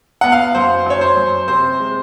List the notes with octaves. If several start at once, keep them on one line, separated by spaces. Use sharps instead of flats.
B3 F#5
F5
F#2 C5
F#2 C#5
C5
F#2
C3 C5
G#3